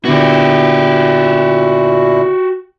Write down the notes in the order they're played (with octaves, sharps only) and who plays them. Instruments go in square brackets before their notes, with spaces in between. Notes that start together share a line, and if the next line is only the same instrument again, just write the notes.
[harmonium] A#2 E4 [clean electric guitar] D3 B3 [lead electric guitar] F#4 G4